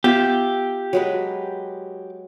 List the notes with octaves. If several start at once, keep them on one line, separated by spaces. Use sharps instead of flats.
B3 F4 G4 E5
F#3 G#3 B4